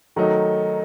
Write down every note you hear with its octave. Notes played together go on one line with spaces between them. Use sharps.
D#3 F#3 A3 D#4